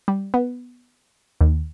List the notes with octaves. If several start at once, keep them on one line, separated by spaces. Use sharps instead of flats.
G3
B3
D#2